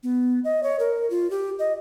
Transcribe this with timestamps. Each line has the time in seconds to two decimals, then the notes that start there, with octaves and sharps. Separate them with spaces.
0.03 B3
0.44 D#5
0.63 C#5
0.79 A#4
1.10 F4
1.30 G4
1.59 D#5